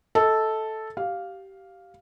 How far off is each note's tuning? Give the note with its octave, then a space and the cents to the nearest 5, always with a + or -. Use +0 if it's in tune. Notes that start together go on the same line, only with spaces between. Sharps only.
A4 -5 D#5 +40
G4 -20 F5 +0